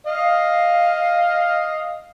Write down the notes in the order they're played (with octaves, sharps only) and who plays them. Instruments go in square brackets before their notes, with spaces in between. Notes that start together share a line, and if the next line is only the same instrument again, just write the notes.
[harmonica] D#5 [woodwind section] F5